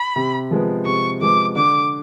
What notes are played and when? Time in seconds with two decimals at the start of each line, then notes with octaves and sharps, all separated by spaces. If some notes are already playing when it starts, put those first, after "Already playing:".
Already playing: B5
0.16 C3
0.51 F3 G#3 B3
0.85 C3 C#6
1.21 F3 G#3 B3 D6
1.56 D3 D6